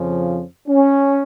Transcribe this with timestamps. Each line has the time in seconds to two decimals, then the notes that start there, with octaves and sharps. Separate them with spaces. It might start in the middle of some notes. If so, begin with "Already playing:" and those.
Already playing: F2 C#3 F3
0.68 C#4